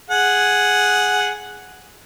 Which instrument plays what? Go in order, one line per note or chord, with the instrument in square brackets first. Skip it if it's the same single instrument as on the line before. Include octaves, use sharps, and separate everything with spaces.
[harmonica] G#4 F#5